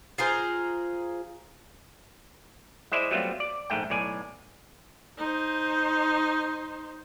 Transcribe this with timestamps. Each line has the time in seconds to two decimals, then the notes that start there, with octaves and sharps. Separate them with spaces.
0.18 F4 G#4 A#4 C5
2.92 G#3 E4 C5 D5 E5
3.11 F#3 G3 A3 B3 C4 F4
3.40 D5
3.70 A#1 G#2 A3 G5
3.90 B1 A2 D5 G#5
5.18 D#4 C5